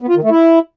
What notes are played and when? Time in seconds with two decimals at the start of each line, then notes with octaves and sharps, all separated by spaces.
0.02 B3
0.09 F4
0.16 D#3
0.23 A3
0.30 E4